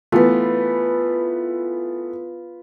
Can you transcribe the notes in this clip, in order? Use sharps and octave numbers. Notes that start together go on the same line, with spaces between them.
E3 A3 B3 F4 B4